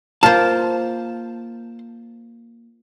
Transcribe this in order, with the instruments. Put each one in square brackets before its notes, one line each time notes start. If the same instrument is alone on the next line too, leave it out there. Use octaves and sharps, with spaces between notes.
[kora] A#3 F4 [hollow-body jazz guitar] C5 A5